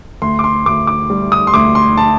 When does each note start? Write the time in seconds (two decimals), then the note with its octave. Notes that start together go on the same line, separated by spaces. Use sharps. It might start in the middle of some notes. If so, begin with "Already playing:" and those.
0.22 D2 C6
0.39 D6
0.44 C6
0.66 D2 D6
0.87 D6
1.10 G3
1.32 D#6
1.47 C6
1.54 D2 D6
1.75 C6
1.97 A5